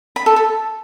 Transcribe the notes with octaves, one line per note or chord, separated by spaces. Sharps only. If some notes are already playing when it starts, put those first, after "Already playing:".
B5
A4
A4